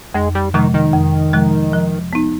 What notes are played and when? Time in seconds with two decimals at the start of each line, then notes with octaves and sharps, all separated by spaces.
0.14 F2 G#3
0.35 G3
0.54 C3 D#3 F3 G#3
0.74 D#3
0.93 F2
1.33 C3 F3 G#3
1.73 F3
2.13 B3 D#4